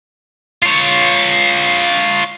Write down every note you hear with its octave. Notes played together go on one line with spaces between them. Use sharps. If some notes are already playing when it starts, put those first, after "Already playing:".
F4 C#5